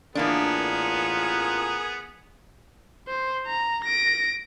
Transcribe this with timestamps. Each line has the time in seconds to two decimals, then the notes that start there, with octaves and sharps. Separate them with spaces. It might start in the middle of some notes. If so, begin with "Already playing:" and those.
0.15 A1 E3 A#3 B3 D4 F4 G#4 A#4
3.08 C5
3.46 A#5
3.84 A#6 D7